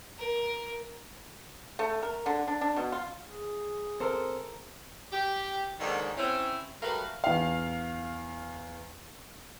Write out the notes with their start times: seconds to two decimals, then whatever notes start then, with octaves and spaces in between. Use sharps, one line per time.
0.18 A#4
1.79 A3
2.03 A#4
2.26 D3
2.47 D4
2.61 D4
2.76 B2
2.92 F4
3.30 G#4
4.00 C4 A4 A#4 C5
5.12 G4
5.79 D#2 G#2 D3 D#3
6.17 C4 C#4 E4
6.82 F#3 G3 A3 A#4 B4 F5
7.24 E2 F5